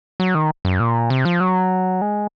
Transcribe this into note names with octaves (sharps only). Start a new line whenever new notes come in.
F#3
D#3
F#2
A#2
C3
F3
F#3
G#3